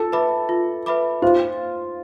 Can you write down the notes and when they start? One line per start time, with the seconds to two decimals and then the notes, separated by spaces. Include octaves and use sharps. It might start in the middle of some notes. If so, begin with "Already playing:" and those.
Already playing: F4 A4
0.12 B4 E5 B5 D6
0.49 F4
0.86 B4 E5 B5 D6
1.22 F4 C5